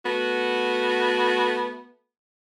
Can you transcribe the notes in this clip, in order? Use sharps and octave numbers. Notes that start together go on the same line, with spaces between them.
A3 B3 F#4